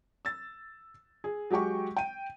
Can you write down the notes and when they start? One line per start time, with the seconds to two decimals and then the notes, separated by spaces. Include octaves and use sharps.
0.25 E6 A6
1.24 G#4
1.50 F#3 G#3 G4 G5 C#6
1.97 G5 D#7